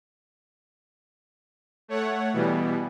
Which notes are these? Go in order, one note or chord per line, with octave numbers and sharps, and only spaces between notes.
A3 C#5 F#5
B2 E3 G3 B3